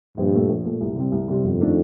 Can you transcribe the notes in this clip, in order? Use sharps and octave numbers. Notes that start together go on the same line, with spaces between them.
A#1 G2
A#2 A3
A#1
A#2 A3
C2
C3 G3 C4
C2
C3 G3 C4
G1 F2
D#3 A3 D4